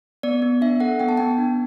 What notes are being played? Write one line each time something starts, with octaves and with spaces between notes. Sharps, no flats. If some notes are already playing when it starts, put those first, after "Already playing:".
B3 D5
B3
D4 E5
A4 F#5
B3 G5
A5
B3 G5
D4